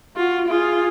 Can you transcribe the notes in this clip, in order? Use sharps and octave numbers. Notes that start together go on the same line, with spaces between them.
F4 F#4
F4 G#4